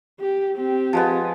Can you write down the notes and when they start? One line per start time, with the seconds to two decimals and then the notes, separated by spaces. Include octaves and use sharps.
0.20 G4
0.55 C4 G4
0.93 F3 G#3 B3